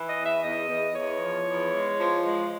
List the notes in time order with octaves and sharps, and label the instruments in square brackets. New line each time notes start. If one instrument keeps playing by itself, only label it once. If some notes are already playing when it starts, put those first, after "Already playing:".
Already playing: [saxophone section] E3
D#5
E2
E5
E2 D#5
E2
E2 C#5
F3
E2
G#3
F3
G#3